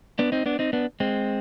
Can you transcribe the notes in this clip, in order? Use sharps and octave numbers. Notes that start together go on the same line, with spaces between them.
B3 D4
C4 D#4
B3 D4
C4 D#4
B3 D4
G#3 C4